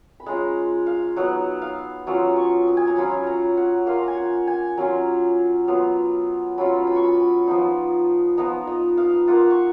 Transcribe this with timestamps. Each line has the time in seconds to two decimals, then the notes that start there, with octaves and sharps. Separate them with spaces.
0.20 B5
0.26 G#3 C#4 F4 A#5
0.87 F5
1.16 F#3 B3 D#4 F#5
1.62 F5
2.06 F#3 C#4 F4 F#5
2.37 C#6
2.67 D#6
2.77 G#5
2.87 A#5
2.97 F#3 C#4 F4 B5
3.27 A#5
3.57 F#5
3.87 A#3 F4 F5
3.98 A#5
4.08 G#5
4.17 F#5
4.47 G#5
4.77 F#3 C#4 F4 A#5
5.68 F#3 B3 F4
6.58 F#3 C#4 F4 B5
6.87 B5
6.96 C#6
7.04 B5
7.17 B5
7.47 F3 B3 D#4
8.38 F3 B3 D#4 A#5
8.67 D#5
8.97 F5
9.28 A#3 F4 F#5
9.50 C#6